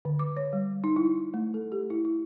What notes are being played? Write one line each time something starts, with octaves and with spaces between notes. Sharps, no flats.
D3
D6
C#5
G3
D#4
E4
A3
A4
G4
E4
E4